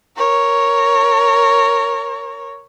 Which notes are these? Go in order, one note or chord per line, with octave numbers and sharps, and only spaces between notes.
A#4 C#5